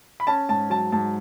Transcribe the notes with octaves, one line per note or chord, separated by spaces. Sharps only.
B5
C#4 A5
G#2 A5
F#3 A5
G#2 A5